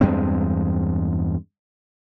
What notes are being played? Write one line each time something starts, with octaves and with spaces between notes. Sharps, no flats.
E2 G2 G#3 C4